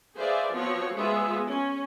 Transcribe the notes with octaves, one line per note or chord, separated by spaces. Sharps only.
G#4 B4 C5 D5 E5 F5
F3 B3 C4 F4 F#4 C#5
G#3 B3 F4 G#4 E5
C#4